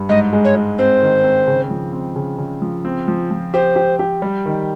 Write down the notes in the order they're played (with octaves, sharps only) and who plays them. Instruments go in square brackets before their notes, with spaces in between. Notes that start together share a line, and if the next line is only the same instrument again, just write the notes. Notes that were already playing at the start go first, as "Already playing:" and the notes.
Already playing: [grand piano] G2
[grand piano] G#2 [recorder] D#5
[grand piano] G#3
[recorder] C#5
[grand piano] G#3
[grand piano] C4 [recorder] C5
[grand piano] D#3
C4
C#3
F3
C4
C#3
C#3
F3
C4
F3
F3
[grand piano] G4 [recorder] C5
[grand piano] G4
G4
G3
D#3